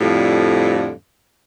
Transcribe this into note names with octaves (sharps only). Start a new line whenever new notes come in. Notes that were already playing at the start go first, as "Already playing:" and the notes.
F2 A2 D3 F3 G3